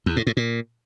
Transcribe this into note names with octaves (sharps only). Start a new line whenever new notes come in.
E2
A2
A2
A#2